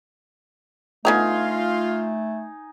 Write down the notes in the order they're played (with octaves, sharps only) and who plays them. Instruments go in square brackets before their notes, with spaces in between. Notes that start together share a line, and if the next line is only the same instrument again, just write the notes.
[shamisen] D3 B3 A#5 [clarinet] A3 [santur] D#4 G#5 [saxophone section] F4